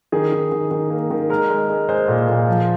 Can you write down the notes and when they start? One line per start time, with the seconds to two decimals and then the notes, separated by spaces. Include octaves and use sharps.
0.12 D#3 G#4
0.32 D#3
0.52 D#3
0.71 D#3
0.90 A#3
1.11 D#3
1.30 G#3 A#4
1.50 G#3
1.69 G#3
1.89 G#3 C5
2.08 A#2
2.28 A#2
2.48 F3